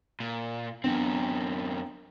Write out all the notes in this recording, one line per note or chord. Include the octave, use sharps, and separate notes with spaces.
A#2
F#2 B3 C4 D4 G5